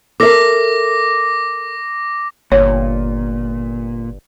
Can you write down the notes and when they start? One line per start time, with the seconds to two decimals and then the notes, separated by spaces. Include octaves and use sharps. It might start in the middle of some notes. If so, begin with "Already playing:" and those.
0.20 A4 A#4 E5 D6 A#6
2.52 G1 A#2 C#5